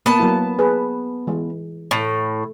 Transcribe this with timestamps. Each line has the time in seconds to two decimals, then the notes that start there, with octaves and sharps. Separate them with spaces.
0.06 A#3 B3 A5
0.19 F#3 A#3 E4
0.59 G#4 B4
1.27 E3 G#3
1.91 A2 A3